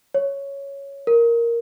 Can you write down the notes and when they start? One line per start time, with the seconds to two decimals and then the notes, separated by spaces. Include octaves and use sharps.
0.14 C#5
1.07 A#4